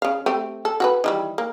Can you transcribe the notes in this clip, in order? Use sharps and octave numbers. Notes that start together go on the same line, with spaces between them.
C#3 F5
A3 C4 G4
A4
F#4 A4 B4
D#3 E3 G3
A#3